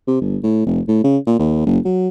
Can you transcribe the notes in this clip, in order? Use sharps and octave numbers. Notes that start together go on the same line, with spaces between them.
C3
G1
A2
F1
A2
C#3
A#2
D#2
F#1
F#3